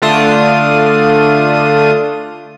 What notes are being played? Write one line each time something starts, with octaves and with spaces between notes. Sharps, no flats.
D3 A3 D4 F4 D#6